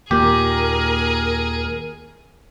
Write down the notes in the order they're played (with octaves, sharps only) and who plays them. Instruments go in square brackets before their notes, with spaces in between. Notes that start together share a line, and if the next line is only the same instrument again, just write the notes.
[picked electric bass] D#2 A#2 [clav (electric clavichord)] G4 [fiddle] G#4 [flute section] A#4